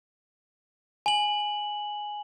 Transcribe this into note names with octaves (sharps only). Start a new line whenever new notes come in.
G#5 F#7